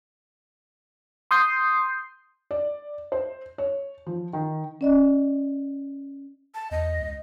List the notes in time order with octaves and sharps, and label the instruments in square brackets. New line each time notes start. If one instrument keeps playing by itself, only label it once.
[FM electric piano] C6 D#6 G6 C7
[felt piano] D5
C5
C#5
F3
D#3
[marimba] C#4 D5 D#5
[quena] A5
[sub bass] E2 [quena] D#5
[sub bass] C#2